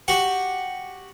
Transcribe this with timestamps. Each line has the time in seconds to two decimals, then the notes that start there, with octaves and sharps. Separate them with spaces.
0.08 F#4 G4 F#5